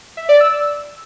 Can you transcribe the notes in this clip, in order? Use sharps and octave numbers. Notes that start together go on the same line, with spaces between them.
E5
D5
E6